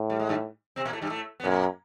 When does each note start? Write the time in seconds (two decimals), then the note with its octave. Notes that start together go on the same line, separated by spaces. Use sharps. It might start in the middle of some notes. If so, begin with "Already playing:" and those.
Already playing: A2
0.10 G3
0.19 G#3
0.29 G2 G3
0.76 C3 C4
0.85 A#2 A#3
0.93 A2 A3
1.02 G2 G3
1.10 A2 A3
1.40 B3
1.44 F#2 A#2 A#3